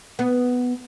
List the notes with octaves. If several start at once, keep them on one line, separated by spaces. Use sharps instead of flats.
B3